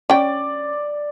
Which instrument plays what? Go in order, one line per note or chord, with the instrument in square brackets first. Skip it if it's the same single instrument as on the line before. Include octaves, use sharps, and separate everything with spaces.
[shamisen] C#4 G5 [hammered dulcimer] D5